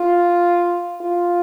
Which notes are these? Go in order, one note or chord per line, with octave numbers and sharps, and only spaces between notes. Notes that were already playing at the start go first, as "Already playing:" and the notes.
Already playing: F4
F4